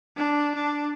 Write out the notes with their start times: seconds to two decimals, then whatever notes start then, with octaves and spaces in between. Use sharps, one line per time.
0.17 D4
0.55 D4